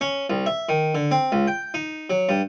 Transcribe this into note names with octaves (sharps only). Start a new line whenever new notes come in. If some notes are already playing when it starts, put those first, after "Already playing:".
C#4
C2
E5
D#3
D3
C4
C#2
G5
D#4
F#3
G2